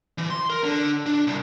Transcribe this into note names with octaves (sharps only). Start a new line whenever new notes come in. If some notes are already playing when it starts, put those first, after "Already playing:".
E3
C6
A#4
D3
D4
C2